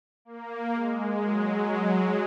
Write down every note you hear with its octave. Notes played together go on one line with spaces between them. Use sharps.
A#3
G#3
F#3